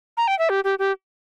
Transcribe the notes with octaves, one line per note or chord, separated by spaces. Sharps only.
A#5
G5
E5
G4
G4
G4